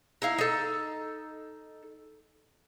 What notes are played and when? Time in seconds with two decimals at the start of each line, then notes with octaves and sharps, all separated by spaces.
0.22 D#4 E4 F5
0.38 D#4 A4